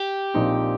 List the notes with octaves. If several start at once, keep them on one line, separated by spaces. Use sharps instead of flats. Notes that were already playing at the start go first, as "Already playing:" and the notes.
Already playing: G4
A#1 A#2 F3 C4 D#4